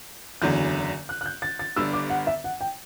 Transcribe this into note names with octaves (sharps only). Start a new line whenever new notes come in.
F#1 E2 D3 F#3 G6
F#6
F#6
G6
A6
A6
G1 G2 D3 E6
D6
F#5
E5
F#5
G5